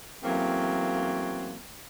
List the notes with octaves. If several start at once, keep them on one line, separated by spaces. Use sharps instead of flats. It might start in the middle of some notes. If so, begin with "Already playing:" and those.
E2 F#3 A3 A#3 C4 C#4